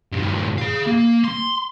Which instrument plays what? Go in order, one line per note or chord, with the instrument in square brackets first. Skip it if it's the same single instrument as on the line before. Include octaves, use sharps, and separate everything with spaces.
[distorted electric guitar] G2 A#2
G#4 F5
A#3
C6